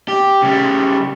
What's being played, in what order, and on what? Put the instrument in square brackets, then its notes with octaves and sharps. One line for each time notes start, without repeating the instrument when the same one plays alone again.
[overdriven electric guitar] G4
C#3 G3